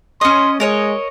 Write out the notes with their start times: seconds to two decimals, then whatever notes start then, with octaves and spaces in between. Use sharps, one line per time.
0.21 C#4 D#5 C6
0.60 G#3 A#4 C#5 D#5